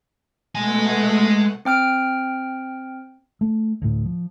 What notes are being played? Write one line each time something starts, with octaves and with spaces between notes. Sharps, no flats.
B2 G#3 A3 F#5 G#5
C4 G5 F6 D7
A3
D2 A2
F3